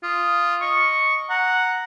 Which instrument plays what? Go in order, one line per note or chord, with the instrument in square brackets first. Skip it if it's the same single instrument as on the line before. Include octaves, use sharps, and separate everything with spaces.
[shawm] F4 [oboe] D#6
[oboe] D#5 [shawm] C#6
[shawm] F#5 [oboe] A#5